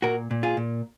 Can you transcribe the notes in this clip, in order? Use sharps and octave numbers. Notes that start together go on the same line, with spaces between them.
A#2 F#4 A#4
A#2
F4 G#4
A#2